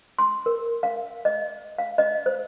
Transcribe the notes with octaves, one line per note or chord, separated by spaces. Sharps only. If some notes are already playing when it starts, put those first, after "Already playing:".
C6
A#4
F5
D#5
F5
D#5
C5